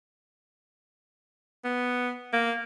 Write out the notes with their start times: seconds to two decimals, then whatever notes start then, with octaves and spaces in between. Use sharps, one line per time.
1.64 B3
2.33 A#3